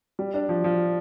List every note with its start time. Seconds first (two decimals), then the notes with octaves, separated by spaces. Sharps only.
0.19 G3
0.34 D4
0.49 F3
0.64 F3